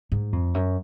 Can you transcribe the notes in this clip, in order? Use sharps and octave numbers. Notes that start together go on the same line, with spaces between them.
G#2
F2
F#2